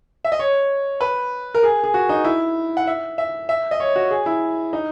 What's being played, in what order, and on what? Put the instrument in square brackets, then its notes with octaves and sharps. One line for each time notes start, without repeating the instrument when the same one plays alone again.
[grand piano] E5
D#5
C#5
B4
A#4
G#4
G#4
F#4
D#4
E4
F#5
E5
E5
E5
D#5
C#5
F#4
G#4
E4
D#4